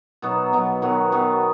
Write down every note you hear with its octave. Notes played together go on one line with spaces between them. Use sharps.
B2 F#3 B3 D#4
B2 F#3 B3 D#4
D#3 F#3 B3 F#4
D#3 F#3 B3 F#4